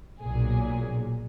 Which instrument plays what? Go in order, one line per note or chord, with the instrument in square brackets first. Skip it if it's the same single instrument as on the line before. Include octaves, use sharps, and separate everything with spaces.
[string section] B1 A#2 F#3 G#4